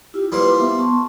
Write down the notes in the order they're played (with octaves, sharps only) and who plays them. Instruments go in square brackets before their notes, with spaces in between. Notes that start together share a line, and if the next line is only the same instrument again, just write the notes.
[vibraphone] E4 F4 [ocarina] G4
[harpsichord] G3 A#3 C5 [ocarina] B4
[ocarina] B3 [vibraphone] E5
[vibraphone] A5 C6 C#6